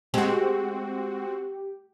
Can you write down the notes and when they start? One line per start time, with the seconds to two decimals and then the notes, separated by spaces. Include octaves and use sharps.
0.14 G#3 C4 F#4 G4